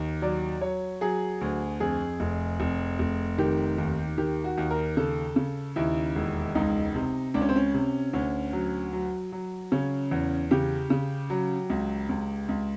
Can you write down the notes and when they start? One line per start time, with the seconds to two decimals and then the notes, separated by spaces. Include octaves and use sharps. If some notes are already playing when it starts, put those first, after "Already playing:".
Already playing: D#2
0.22 F#3 D5
0.61 F#3 C#5
1.01 F#3 G#4
1.41 D2
1.80 F2 G#4
2.20 F1
2.60 F1
2.99 F1
3.38 D#3 G4
3.78 D#2
4.18 D#3 G4
4.44 F#4
4.58 D#2
4.70 A#4
4.97 C#3 A4
5.36 C#3
5.76 D#2 E4
6.15 E1
6.55 C#2 D#4
6.95 C3
7.34 C#2 D4
7.41 C#4
7.49 C4
7.56 C#4
7.74 C3
8.13 D2 C#4
8.53 F#3
8.93 F#3
9.32 F#3
9.72 C#3 C#4
10.11 E2
10.51 C#3 G4
10.90 C#3
11.30 F#3
11.70 C#2
12.09 C#2
12.49 C#2